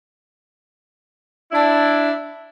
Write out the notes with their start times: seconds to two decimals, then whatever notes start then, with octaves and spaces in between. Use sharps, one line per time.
1.52 D4 E4